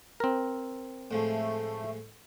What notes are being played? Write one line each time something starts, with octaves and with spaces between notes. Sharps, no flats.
C4 A#4
A2 F3 G#3 A3